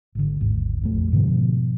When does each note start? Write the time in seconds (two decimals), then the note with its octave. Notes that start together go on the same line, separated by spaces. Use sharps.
0.15 G#1 D3
0.41 G#1 D#2
0.81 A#1 F2 A3
1.12 G#2 B2 D3 F3